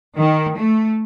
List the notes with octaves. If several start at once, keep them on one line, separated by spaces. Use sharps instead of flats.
D#3
A3